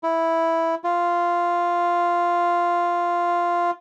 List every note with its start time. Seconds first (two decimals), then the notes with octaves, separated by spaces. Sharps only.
0.03 E4
0.84 F4